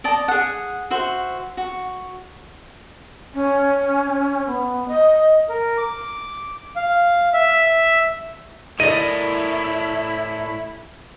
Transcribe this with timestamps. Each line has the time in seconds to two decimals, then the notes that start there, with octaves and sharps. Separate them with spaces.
0.04 D5 D#5 A5
0.28 G#4 F#5
0.90 F#4 C5 E5
1.57 F#4
3.34 C#4
4.47 B3
4.88 D#5
5.49 A#4
5.78 D6
6.76 F5
7.33 E5
8.80 A2 E4 A#4 D5 D#5 D#7